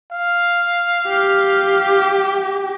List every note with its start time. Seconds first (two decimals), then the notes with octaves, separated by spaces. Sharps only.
0.13 F5
1.07 G4